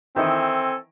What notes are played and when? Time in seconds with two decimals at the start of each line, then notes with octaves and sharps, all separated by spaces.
0.16 D#3 E3 C4 E4 A4 G#5